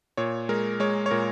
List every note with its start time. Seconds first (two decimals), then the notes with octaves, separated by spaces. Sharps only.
0.17 A#2 C#5
0.49 G#3 A#4
0.80 G#3 C#5
1.06 C#5
1.11 A#2 A#4